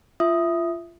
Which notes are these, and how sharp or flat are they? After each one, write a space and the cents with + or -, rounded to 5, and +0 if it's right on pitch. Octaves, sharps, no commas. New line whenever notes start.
F4 -25 E5 +0 D#6 +0